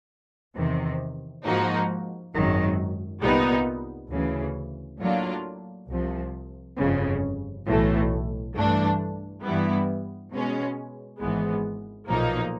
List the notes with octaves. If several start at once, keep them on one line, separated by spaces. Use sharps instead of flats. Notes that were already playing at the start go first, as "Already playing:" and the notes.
E2 C3 D#3
G#2 F3 A#3 D#4 F#4
G#1 F#2 D#3 F#3
C2 A#2 G3 B3 D#4
D2 C#3 E3
A2 F#3 A#3 D4 F4
C2 C3 F3
G1 F2 C#3
B1 A2 E3 A3
G2 E3 A3 D4
G2 E3 G3 B3 E4
B2 G#3 C#4
G#1 G#2 E3 G#3 B3
B1 A#2 F3 A#3 D#4